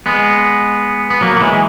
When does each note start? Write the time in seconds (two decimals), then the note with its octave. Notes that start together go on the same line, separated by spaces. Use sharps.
0.06 G#3 B3
1.10 B3
1.21 F#3 A#3
1.36 F#3
1.41 E3 G#3